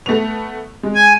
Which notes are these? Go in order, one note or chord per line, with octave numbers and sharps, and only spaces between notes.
A3 B3 F7
G#3
G#5